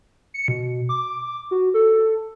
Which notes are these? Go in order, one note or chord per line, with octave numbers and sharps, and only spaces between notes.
C#7
B2
D6
F#4
A4